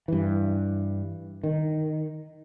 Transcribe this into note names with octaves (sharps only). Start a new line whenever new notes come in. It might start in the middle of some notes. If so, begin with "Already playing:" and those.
G2 E3
D#3